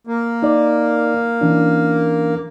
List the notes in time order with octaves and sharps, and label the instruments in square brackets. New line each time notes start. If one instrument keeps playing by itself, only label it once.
[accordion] A#3
[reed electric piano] D#4 D5
E3 C#4 D4